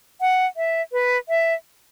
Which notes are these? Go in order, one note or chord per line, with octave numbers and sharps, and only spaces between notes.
F#5
E5
B4
E5